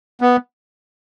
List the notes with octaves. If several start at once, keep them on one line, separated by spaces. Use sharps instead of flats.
B3